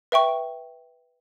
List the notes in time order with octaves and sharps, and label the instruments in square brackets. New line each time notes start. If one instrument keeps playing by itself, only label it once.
[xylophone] B4 E5 G5 C#6